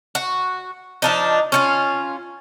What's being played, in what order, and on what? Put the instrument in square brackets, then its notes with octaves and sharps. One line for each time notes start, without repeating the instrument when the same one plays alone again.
[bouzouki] F#4
F3 D4 D#4
C#4 D#4 F4